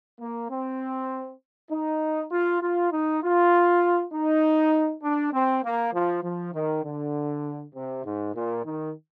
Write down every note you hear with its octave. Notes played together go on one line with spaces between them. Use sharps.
A#3
C4
D#4
F4
F4
D#4
F4
D#4
D4
C4
A#3
F3
F3
D#3
D3
C3
G#2
A#2
D#3